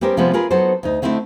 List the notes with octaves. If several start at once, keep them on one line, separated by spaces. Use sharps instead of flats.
G3 B3 C#4 G4 A#4 C5
C3 F3 G3 G#3 B3 C4
F4 G#4 A#4 B4
F#3 B3 D#4 A4 C5
D2 D#4
D3 A3 C4 D#4 E4